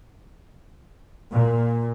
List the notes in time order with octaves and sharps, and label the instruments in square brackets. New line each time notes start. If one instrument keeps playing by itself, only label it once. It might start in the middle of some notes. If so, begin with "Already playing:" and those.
[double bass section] A#2